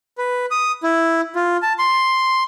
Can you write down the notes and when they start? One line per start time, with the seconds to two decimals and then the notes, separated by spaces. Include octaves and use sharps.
0.18 B4
0.51 D#6
0.83 E4
1.35 F4
1.62 A5
1.79 C6